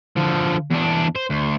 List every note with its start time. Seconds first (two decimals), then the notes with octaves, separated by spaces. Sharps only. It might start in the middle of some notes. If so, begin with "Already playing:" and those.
0.16 D3 F3
0.70 E2 D4
1.15 C5
1.30 D2